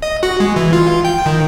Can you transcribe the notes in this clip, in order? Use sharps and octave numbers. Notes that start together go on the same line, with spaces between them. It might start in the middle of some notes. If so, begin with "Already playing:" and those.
D#5
F#4
G#3
E3
F4
G5
D#3